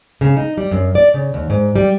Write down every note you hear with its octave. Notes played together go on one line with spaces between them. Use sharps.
C#3
D#4
G3
F#2
D5
C#3
D#2
G#2
G3